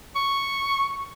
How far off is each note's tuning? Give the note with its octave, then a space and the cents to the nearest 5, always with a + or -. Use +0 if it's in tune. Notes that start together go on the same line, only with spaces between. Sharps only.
C#6 +0